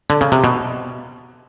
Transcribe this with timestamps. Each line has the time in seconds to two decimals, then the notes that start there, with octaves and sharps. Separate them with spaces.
0.10 D3
0.21 C#3
0.32 C3
0.44 B2